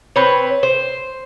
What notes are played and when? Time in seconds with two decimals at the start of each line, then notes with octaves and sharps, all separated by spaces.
0.16 C4 B4 C#5
0.63 C5